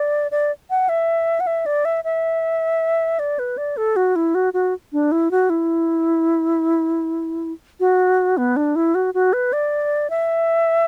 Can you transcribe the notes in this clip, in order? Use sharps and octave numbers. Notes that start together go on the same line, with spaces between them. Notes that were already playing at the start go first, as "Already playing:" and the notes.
Already playing: D5
D5
F#5
E5
F#5
E5
D5
E5
E5
D5
B4
D5
A4
F#4
E4
F#4
F#4
D4
E4
F#4
E4
F#4
B3
D4
E4
F#4
F#4
B4
D5
E5